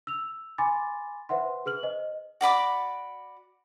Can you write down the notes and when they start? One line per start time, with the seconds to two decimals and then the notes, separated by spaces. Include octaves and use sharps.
0.07 E6 F7
0.58 G#5 B5 C6 D6 A6
1.29 B4 C5 E5 F#5 C6
1.66 G#4 B4 F6 F#7
1.83 C5 D#5
2.41 F#4 D5 B5 D6